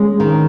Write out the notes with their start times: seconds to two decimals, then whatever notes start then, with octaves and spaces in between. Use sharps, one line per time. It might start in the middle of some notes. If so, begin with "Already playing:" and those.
Already playing: G#3 C#4
0.20 D#3